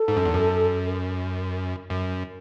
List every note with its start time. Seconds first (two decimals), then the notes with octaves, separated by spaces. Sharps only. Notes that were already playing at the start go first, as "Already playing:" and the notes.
Already playing: A4
0.08 G#2
0.16 F#2
0.25 E2
0.34 F#2
1.90 F#2